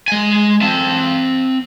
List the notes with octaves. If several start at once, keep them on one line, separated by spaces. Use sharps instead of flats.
G#3 G#5
C4 A5